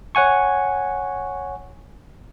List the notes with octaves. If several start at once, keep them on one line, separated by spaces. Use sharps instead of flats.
C#5 F#5 G#5 C#6